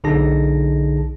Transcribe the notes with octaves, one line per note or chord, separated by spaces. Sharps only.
B1 D3 D#4 G#4 A5 A#6